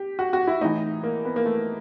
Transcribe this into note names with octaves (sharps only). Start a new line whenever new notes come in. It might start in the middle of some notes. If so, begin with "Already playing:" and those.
Already playing: G4
F#4
F#4
E4
A2 E3 D#4
A#3
B3
A#3
A3